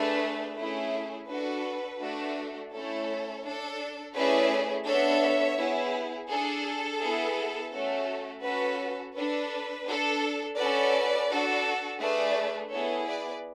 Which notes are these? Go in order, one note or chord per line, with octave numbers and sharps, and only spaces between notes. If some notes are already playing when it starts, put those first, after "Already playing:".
Already playing: A3 D4 G#4 B4
A3 C#4 E4 G#4
D4 F#4 A4 B4
A3 D4 F#4 A4
A3 C#4 E4 A4 C#5
D4 A4
A3 C#4 E4 G#4 B4 D5
B3 D4 A4 C#5 E5
B3 E4 G#4
D4 G#4 A4
B3 E4 G#4
A3 C#4 F#4 A4
C#4 F#4 A4 B4
D4 A4 B4
D4 A4
C#4 F#4 A4 B4 D5
D4 F#4 A4
A3 D4 G#4 B4 D5
B3 E4 G#4 A4 C#5
B4 D5